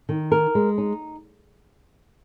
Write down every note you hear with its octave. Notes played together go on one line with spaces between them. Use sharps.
D#3
A#4
G#3
D#4